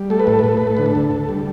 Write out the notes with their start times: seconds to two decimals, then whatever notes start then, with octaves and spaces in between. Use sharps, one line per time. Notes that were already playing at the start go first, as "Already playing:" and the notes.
Already playing: G3
0.10 A3 A4
0.20 B4
0.27 A2 A4
0.39 B4
0.44 A2
0.49 A4
0.57 A2 B4
0.67 A4
0.77 D3 B4
0.86 A4
0.95 D2
1.11 D2
1.29 G3